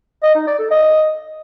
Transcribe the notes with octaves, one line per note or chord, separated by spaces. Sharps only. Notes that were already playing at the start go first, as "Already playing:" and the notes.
D#5
D#4
D5
A4
D#5